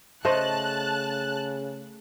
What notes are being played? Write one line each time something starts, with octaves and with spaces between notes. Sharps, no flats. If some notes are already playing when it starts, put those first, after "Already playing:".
C#3 A3 C5 D#5 A5 F#6